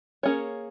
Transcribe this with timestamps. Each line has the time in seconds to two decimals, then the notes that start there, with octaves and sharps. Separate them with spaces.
0.23 A#3 C#4 G#4 C#5